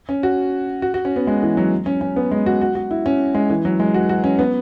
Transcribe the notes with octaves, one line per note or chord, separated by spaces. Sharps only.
C#4
F#4
F#4
F#4
C#4
B3
G#3
E3
F#3
C#4
C#4
B3
G#3
F#4
F#4
F#4
E4
C#4
G#3
E3
F#3
G#3
F#4
F#4
C#4
B3